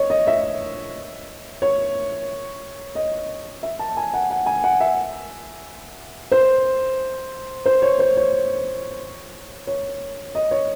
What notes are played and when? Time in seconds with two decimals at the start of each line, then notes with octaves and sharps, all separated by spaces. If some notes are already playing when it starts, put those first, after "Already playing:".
Already playing: C#5 D#5
0.10 D#5
0.27 E5
1.62 C#5
2.95 D#5
3.63 E5
3.79 A5
3.97 G#5
4.14 F#5
4.30 F#5
4.46 G#5
4.64 F#5
4.81 E5
6.32 C5
7.66 C5
7.82 C#5
7.99 C5
8.17 C#5
9.67 C#5
10.35 D#5
10.51 C#5